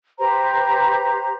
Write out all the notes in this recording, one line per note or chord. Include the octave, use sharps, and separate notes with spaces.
G4 B4 C5 A#5